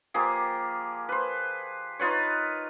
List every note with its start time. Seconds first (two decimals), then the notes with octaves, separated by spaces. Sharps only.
0.14 F3 A#3 G4 G#4
1.09 B4 C5
1.99 D#4 F4 B4 C#5